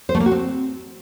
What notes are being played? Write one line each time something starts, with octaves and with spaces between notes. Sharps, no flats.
C5
A3
A#3
F#4
C4